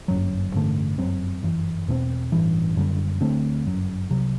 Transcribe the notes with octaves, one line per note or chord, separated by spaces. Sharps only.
G1 F#2 F#3
A1 G2 D3 A3
G1 F#2 F#3 C4
G1 F#2 E3
E2 B2 A3 C4
A1 G2 E3
F#1 F#2 D3 G3
D2 D3 A3 C4
G1 F#2 F#3
C2 C3 F#3